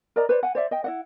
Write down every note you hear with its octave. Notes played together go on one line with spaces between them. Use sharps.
A#4 D5 D#5 A#5
B4 C5 D5
F#5 G#5
C5 D5 E5
D#5 G5
E4 D#5 F#5